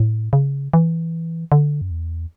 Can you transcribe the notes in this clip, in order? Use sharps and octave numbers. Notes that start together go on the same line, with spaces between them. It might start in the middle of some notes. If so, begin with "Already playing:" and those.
Already playing: A2
C#3
E3
D3
F#2
E2